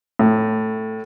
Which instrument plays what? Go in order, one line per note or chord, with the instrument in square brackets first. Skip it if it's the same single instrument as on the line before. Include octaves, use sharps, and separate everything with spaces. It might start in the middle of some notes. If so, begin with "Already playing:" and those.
[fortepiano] A2